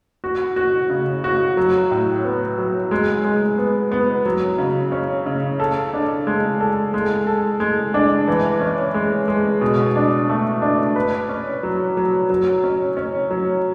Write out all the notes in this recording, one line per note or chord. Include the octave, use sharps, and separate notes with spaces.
F#4
F#4
C#3
F#4
F#3
A2
B3
F#3
G#3
G#3
B3
B3
F#3
C#3
C#4
C#3
A4
D4
G#3
A4
G#3
A4
G#3
D4
E3
C#4
G#3
G#3
B2
D4
A3
D4
B4
C#4
F#3
F#3
F#3
C#4
C#4
F#3